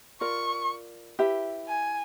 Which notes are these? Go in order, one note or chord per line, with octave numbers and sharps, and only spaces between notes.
F4 A#4 D5 C#6
E4 G4 B4 E5
G#5